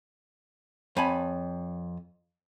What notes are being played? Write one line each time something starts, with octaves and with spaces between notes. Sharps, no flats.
F2 C#5 G#5 A5 B5